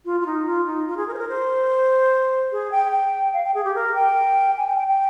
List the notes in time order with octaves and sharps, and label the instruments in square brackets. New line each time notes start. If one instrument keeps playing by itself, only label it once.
[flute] F4
F4
D#4
F4
D#4
F4
G#4
A#4
C5
A#4
C5
G#4
G5
G5
F5
G5
G#4
G4
A#4
G5
G#5
G5
G5
G5